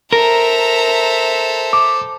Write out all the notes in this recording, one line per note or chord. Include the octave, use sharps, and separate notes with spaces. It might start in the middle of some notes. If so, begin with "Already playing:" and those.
A4 A#4 C5 E5 A#5
D6